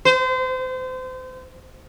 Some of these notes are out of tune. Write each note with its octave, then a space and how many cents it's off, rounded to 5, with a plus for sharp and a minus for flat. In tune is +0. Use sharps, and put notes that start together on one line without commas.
C5 -30